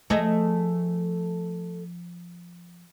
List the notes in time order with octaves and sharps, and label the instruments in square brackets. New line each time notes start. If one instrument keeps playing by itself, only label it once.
[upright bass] F3 [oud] A3 G#4 D#5